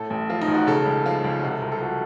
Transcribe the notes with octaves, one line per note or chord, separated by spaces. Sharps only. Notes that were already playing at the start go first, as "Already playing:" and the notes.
Already playing: A2 A4
A1
F3 F4
D#4
A1
F#4
C#3 A4
C#2
F3 F4
C#2
C3 F#4
A4
C2 A#4
A4
F3 F#4